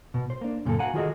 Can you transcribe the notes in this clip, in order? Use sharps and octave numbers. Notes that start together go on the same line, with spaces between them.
B2
C5
A#3 D4
F#2 A#2 C#3 G4 A4
F#4 B4 F5 F#5 G#5 A#5
D#3 F4 F#4 G#4 A4 D#5